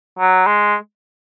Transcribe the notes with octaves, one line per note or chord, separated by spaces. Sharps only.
F#3
G#3